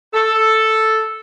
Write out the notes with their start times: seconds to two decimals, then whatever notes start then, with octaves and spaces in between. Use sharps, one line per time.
0.14 A4